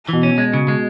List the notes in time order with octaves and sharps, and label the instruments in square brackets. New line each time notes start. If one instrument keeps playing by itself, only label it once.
[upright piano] B2 [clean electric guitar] E3
[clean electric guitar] C#4
G#3
C#3
G#3